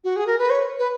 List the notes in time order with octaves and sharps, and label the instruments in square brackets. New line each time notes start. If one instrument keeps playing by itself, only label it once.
[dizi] F#4
G#4
A#4
B4
C#5
B4